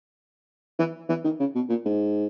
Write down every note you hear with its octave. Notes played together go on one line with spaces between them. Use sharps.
E3
E3
D#3
C#3
B2
A#2
G#2